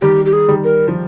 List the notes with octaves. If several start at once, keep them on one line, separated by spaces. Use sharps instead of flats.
D#3 G3 G4
G4
G#4
D#3 G3
A#4
F3